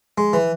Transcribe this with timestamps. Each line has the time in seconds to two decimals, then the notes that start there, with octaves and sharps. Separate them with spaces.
0.18 G#3
0.33 E3